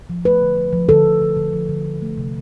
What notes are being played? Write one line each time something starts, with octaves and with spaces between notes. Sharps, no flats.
F3
A3 B4
D3
F3
F3
D3 A4
D3
D3
D3
F3
D3
D3
A3
C3